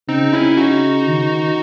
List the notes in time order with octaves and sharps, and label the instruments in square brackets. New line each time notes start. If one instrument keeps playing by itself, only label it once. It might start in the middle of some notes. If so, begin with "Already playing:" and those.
[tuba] C#3 [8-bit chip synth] C4 D#4
[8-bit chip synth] C#4 E4
D#4 F#4
[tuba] D#3